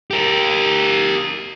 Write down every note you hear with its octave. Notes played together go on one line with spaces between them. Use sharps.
G4 A#4